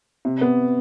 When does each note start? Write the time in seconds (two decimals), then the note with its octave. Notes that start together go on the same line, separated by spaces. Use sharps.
0.25 C3
0.41 B3